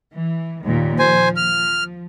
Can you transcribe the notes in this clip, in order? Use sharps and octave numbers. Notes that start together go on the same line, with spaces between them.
E3
D#2 A#2 D#3
F3 C5 G#5
F6